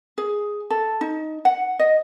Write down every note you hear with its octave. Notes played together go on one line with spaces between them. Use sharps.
G#4
A4
D#4
F#5
D#5